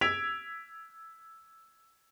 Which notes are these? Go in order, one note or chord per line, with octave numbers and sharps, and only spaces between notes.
E6 G#6 B6 D7 F7